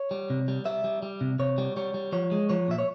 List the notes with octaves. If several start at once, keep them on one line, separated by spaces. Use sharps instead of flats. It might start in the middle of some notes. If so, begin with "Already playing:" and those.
Already playing: C#5
G3
C3
G3
G3 E5
G3
G3
C3
C3 C#5
G3
G3 C#5
G3
F3 C#5
G#3
F3 C#5
A#2 E5
C#5